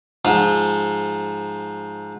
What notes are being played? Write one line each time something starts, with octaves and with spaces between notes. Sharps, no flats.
G#2 F3